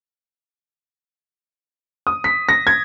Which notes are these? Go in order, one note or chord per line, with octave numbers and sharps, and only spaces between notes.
D#6
B6
A#6
G#6